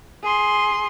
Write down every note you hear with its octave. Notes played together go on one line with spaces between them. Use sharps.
G#4 C6